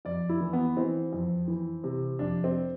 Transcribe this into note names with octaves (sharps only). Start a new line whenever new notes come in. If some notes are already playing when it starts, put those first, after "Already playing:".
F2 D5
E4
E3
B3
E3 C4
F2
E3
C3
F2 D4
C4